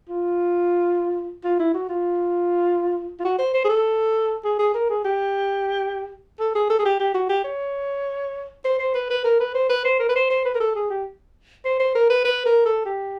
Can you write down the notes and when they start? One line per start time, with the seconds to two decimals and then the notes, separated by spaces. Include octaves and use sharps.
0.09 F4
1.44 F4
1.59 E4
1.74 F#4
1.89 F4
3.19 F4
3.25 F#4
3.39 C5
3.54 C5
3.65 G#4
3.69 A4
4.44 G#4
4.59 G#4
4.74 A#4
4.90 G#4
5.05 G4
6.40 A4
6.55 G#4
6.70 A4
6.79 G#4
6.85 G4
7.00 G4
7.14 F#4
7.29 G4
7.44 C#5
8.65 C5
8.79 C5
8.94 B4
9.10 B4
9.24 A#4
9.40 B4
9.54 C5
9.69 B4
9.85 C5
9.99 A#4
10.09 B4
10.16 C5
10.30 C5
10.45 B4
10.55 A#4
10.60 A4
10.75 G#4
10.90 G4
11.65 C5
11.80 C5
11.95 A#4
12.10 B4
12.25 B4
12.46 A#4
12.65 A4
12.85 G4